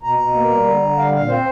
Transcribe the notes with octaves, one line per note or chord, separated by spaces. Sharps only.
B2 A#5
B2
A#3
G3
D3
D3
G3 F5
A#2 F5
C4 C5